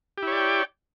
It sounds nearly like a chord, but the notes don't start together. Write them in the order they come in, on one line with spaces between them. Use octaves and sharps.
G4 E4 C#5 D5 G5